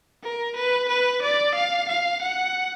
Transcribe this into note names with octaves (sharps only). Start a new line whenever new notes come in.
A#4
B4
B4
D5
F5
F5
F#5